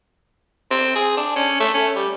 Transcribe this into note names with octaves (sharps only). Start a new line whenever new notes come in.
C4
G#4
D4
C#4
A3
C#4
G3